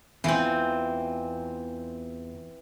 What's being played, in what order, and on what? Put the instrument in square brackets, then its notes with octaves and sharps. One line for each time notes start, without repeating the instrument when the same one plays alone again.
[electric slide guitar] E2 F4 [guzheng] E3 C4